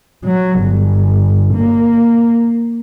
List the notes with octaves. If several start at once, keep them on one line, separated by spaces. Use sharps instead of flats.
F#3
G1
A#3